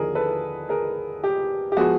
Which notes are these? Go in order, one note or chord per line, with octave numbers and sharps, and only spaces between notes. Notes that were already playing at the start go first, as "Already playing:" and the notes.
Already playing: D#2 D3 F3 G#4 A#4
A4 B4
G#4 A#4
G4
G4
F3 G#3 B3 F#4 G#4